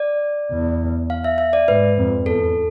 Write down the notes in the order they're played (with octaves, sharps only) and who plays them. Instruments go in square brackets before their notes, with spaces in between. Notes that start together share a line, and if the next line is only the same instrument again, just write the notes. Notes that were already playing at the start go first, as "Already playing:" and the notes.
Already playing: [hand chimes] D5
[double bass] E2
[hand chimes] F5
E5
E5
D5
[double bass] G#2 [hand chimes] B4
[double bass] F2
[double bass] E2 [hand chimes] A4